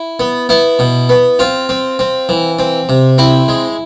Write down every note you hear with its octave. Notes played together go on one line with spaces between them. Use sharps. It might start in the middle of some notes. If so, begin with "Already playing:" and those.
Already playing: E4
B3
B3 E4
B2
B3
C4 F4
C4
C4
E3
C4
C3
C4 E4
G#3